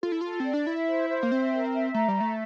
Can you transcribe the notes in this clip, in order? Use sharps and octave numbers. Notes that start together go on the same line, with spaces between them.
F4 A4
E4
F4 A4
C4
D5
D4
E4 E5
C5
C5
A#3
C4 E5
A#4
E5
A3 A#5
G3
A3 E5